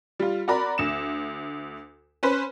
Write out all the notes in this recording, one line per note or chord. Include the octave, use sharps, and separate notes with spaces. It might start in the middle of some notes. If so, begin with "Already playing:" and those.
G3 F4
F#4 A#4 D5 A#5 B5
D2 E7
C#4 B4 C5